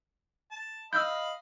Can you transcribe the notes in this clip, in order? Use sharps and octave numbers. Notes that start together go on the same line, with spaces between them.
A5
D#5 F5 B5 E6 G6